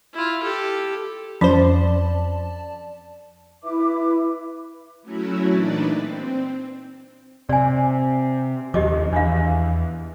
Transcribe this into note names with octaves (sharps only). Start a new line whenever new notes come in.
E4 F4
G4 A4
F2 F3 C#4 C5 D5 A5
E4 B4 E5 D6
F#3 A3 C#4 E4 F#4
A#2 E3 D4 D#4 B4 D5
C4
C3 D5 G#5
D#2 F3 G4 D#5 D6
E2 D4 F5